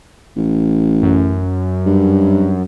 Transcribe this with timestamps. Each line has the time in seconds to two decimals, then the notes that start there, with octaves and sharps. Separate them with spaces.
0.36 A1
1.02 F#2
1.86 G2